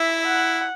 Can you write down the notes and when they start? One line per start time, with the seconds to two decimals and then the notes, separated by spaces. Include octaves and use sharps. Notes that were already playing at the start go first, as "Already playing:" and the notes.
Already playing: E4 E5
0.27 F#5